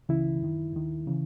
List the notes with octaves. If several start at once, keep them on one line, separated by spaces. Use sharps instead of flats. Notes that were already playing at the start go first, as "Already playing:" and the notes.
C#2 C#3 E3 E4
F#2 D#3
D#2 D#3
C#3 E3